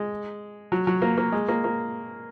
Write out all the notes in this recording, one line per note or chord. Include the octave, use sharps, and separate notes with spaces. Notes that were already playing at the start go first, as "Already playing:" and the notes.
Already playing: G#3
F#3
F#3
A#3
A#3
G#3
A#3
A#3